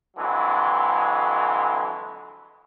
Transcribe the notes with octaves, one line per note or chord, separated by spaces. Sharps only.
F2 D3 E3 F#3 G#3